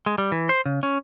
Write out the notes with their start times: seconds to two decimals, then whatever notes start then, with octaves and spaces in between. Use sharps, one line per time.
0.06 G#3
0.18 G3
0.32 E3
0.49 C5
0.66 C#3
0.83 C#4